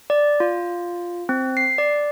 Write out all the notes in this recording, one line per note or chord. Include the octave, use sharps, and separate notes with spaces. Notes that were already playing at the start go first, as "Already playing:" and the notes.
D5
F4
C4
C7
D5